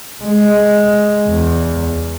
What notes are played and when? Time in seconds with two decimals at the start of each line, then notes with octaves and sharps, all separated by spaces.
0.23 G#3
1.28 E2